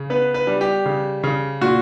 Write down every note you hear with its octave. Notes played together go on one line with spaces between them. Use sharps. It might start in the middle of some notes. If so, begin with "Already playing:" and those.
Already playing: C#3
B3 B4
B4
G3
G4
C#3
C#3
A#2 F#4